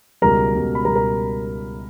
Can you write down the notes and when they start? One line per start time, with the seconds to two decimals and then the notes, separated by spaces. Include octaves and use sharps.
0.22 C#2 B2 G3 A#4 A#5
0.54 C#2 B2 G3
0.75 B5
0.85 C#2 B2 G3 A#4 A#5
0.96 A#4 A#5